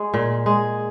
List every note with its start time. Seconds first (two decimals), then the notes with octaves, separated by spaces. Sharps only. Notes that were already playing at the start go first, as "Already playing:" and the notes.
Already playing: G#3
0.14 A#2
0.46 G#3